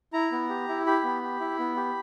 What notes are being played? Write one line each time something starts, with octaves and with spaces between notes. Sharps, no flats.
E4 A#5
B3
G4
E4
G4 B5
B3
G4
E4
B3
G4